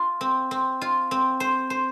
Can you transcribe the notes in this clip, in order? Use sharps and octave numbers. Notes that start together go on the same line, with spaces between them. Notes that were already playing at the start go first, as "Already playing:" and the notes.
Already playing: F4
C4
C4
F4
C4
C5
C5